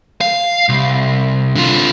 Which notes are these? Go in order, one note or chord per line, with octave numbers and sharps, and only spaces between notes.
F5
C2
D3 F4